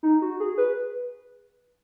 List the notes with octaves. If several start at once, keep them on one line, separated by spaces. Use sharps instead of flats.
D#4
F#4
G#4
B4